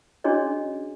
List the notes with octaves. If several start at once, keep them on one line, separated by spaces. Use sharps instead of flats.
C#4 D4 F#4 G#4 C#5 D#5